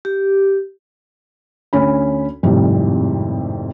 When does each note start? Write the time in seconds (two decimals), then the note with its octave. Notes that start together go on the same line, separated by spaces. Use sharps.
0.05 G4
1.73 D2 C#4 B5
2.43 G#1 F2 A2 C3 G3